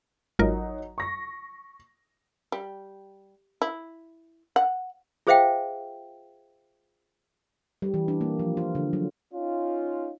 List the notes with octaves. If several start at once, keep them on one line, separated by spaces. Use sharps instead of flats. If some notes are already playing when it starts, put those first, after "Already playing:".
G#1 F#3 D#4 F4 A#4
C#6 A#6
G3
E4
F#5
F4 G#4 C5 E5 F5 G5
G3
E3
D4
A#3
F3
F4
D3
F#3
C#4 D#4 F4